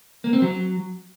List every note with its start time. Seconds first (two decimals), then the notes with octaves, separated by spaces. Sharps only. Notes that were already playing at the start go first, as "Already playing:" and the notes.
0.24 A#3
0.33 C4
0.42 F#3